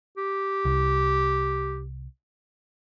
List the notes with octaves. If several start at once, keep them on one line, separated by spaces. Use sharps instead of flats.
G4
C2